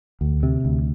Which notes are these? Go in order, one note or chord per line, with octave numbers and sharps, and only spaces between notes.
D2
C3
D2